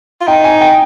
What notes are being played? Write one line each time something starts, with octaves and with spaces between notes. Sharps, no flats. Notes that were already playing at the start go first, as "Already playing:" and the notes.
F4
D#4 G5
G#5
G5